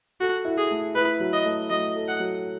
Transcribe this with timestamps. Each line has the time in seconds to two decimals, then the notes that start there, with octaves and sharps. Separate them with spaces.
0.20 F#4 A4
0.45 E4
0.57 G#4
0.71 A3
0.95 E4 B4
1.20 F#3
1.33 D#5
1.45 A3
1.70 F#3 D#5
1.95 A4
2.08 F#5
2.20 F#3